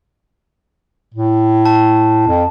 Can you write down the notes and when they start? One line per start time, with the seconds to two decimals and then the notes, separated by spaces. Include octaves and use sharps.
1.14 A2
1.65 A5
2.28 F2